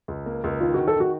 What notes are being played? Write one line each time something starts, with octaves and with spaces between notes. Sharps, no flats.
C#2
A#3
C#2
D#3 F4
D#3 F#4
A4
D#3 F#4